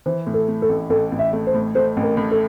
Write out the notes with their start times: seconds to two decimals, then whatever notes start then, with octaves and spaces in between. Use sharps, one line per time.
0.06 E3 C5
0.27 A2
0.34 A4
0.48 A3
0.62 A4
0.69 A1
0.90 A1 A4
1.12 A1
1.19 E5
1.33 A3
1.47 C5
1.54 A2
1.75 A3 C5
1.97 A1
2.03 A#4
2.17 A2
2.31 A4